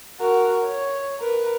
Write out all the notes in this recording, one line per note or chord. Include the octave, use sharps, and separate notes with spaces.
F#4 A#4
C#5
A#4 B4